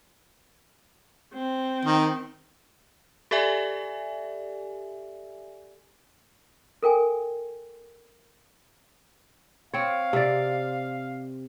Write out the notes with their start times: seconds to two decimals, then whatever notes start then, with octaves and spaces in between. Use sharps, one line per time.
1.34 C4
1.85 D#3
3.31 G4 A4 D5 E5 G#5
6.83 A4 A#4 G5 G#5
9.74 C4 C#5 F5
10.13 C3 D5